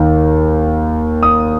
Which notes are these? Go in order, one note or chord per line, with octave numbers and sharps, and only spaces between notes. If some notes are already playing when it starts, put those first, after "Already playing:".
Already playing: D#2 D#3
D#6